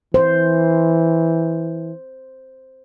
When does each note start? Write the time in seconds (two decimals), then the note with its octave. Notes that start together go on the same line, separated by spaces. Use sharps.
0.14 E3 C5